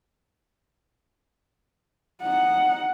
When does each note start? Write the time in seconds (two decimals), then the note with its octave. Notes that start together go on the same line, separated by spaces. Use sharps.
2.23 D#4 F#5